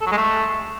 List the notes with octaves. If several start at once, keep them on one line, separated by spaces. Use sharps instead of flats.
A4
F#3
G#3
A3